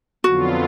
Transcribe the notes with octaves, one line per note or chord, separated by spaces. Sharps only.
F2 D3 F#3 B3 F4 F#4